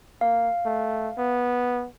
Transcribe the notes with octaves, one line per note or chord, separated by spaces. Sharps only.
A#3 F5
A3
B3